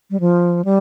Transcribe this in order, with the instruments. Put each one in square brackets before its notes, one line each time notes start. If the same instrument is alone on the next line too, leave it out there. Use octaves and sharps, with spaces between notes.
[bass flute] G3
F3
G3